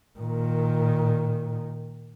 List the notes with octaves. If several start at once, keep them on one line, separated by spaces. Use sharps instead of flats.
A#2 D#3